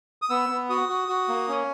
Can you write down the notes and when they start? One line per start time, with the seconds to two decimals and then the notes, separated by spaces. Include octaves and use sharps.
0.22 D#6
0.30 B3 E6
0.49 B3
0.69 F#4 D#6
0.89 F#4
1.08 F#4
1.29 A#3
1.48 C#4